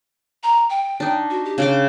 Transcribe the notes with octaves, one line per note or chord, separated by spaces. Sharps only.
A#5
G5
D4 D#4
F#4
G4
C#3 D4 G5 D6